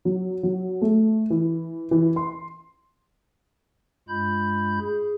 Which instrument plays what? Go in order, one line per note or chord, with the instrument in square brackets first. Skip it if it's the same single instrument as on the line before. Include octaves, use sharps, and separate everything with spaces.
[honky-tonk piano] F#3
F#3
A3
E3
E3
C6
[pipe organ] G2 G#3 F4 B5 G6
G#4